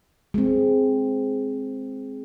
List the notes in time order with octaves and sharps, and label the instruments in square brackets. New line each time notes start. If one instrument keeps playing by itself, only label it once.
[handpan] G#3 C4